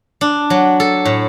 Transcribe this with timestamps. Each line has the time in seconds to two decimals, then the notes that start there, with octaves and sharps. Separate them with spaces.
0.21 D4
0.50 F#3
0.80 A4
1.05 A2